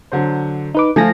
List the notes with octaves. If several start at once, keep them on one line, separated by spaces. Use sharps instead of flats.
D3 F#3 C5
D#4 B4 D6
F3 A3 F4 G#5 A#6